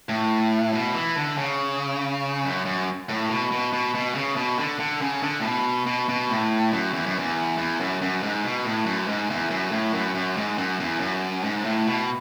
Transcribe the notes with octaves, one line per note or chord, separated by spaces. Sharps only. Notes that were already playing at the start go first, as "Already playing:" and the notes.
A2
B2
E3
D3
C#3
F#2
F#2
A2
B2
B2
B2
B2
C#3
B2
D3
D3
C#3
D3
A2
B2
B2
B2
A2
F#2
E2
F#2
E2
E2
F#2
F#2
G#2
B2
A2
F#2
G#2
E2
F#2
A2
F#2
F#2
G#2
F#2
E2
F#2
G#2
A2
B2